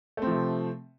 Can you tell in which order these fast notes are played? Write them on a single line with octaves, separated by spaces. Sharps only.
A3 C4 F3 C3